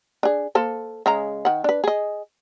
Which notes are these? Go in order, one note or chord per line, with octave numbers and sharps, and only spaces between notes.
D4 G#4
A#3 A4 C5
C#3 G#3 A#5
D#3 F#5
D4 B4
G#4 D#5